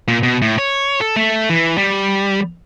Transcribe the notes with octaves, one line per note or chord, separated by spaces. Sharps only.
A#2
B2
A2
C#5
A4
A3
E3
G3